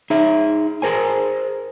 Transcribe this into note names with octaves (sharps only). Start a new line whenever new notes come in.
D#4 G#4 E5
G#4 A#4 C5 G#5